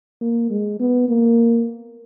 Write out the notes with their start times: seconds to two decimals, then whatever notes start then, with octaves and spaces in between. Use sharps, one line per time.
0.21 A#3
0.50 G#3
0.80 B3
1.08 A#3